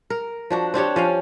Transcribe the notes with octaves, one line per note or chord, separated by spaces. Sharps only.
A#4
F3 D4 F#4
C4 D4 G4 C#5
F3 C#4 F5